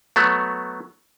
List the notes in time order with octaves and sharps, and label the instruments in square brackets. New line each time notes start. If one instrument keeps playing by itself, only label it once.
[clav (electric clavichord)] F#3 A3 B3